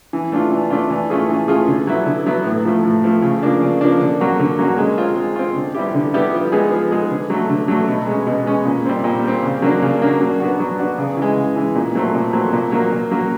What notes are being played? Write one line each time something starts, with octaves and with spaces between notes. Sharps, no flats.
E3
A3 D4 F4
E3
A3 D4 F4
E3
A3 C#4 F4 G#4
E3
A3 C#4 F4 G#4
D3
F#3 B3 E4
D3
F#3 B3 E4
A2
F3 A3
A2
F3 A3
C#3
F3 A#3 D4
C#3
F3 A#3 D4
D3
F#3 A#3 C#4 F#4
D3
F#3 A#3 C#4 F#4
G#3
C4 F4
G#3
C4 F4
D3
G3 B3 E4 G4
D3
G3 B3 E4 G4
F3
G#3 B3 D#4 G#4
F3
G#3 B3 D#4 G#4
D3
F#3 A3
D3
F#3 A3
B2
G#3 C#4
B2
G#3 C#4
A#2
G3 C4
A#2
G3 C4
C#3
F#3 A#3 D4
C#3
F#3 A#3 D4
F#3
B3 D4 F#4
F#3
B3 D4 F#4
C#3
E3 G#3
C#3
E3 G#3
A#2
F#3 A3 C4
A#2
F#3 A3 C4
A#2
F#3 A#3
A#2
F#3 A#3